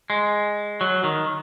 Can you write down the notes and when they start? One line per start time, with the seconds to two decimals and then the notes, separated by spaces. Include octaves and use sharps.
0.10 G#3
0.81 F#3
1.04 D#3